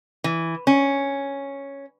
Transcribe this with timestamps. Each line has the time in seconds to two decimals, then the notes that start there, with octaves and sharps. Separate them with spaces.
0.24 E3
0.67 C#4